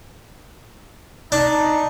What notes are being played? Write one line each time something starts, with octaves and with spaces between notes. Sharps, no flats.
D4 D#4